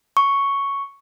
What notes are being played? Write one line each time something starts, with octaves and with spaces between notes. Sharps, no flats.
C#6